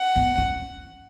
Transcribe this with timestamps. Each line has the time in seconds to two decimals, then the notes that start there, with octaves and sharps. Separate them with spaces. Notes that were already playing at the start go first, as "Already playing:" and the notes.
Already playing: F#5
0.16 B3
0.38 C#4